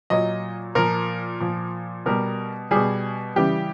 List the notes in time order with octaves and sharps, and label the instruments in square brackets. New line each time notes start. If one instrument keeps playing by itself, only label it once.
[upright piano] A#2 F#3 D#5
A#2 F3 A#4
A#2 F3
B2 G3 A#4
B2 G3 G#4
C#3 E3 G3 G4